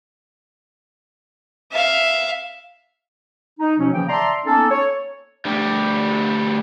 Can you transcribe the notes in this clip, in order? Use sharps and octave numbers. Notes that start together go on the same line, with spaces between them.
E5 F5
D#4
B2 F3 F#3 C#4
C#3 E3 F3 A#3 G5
D5 E5 A5 A#5 C6
A#3 B3 C#4 D#4 A4
C#5
D2 G3